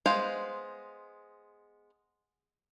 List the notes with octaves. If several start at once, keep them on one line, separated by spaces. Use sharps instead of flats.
G#3 B3 C5 F5